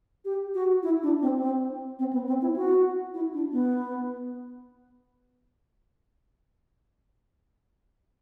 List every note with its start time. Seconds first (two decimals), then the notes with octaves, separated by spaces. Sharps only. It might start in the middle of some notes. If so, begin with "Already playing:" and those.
0.25 G4
0.54 F#4
0.83 E4
1.03 D4
1.22 C4
1.41 C4
1.99 C4
2.13 B3
2.27 C4
2.42 E4
2.56 F#4
3.14 E4
3.33 D4
3.52 B3